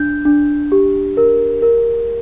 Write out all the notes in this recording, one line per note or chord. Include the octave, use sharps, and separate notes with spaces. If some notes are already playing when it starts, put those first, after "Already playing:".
Already playing: D4 G6
D4
G4
A#4
A#4